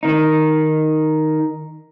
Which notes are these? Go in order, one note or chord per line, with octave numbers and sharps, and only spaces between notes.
D#3 D#4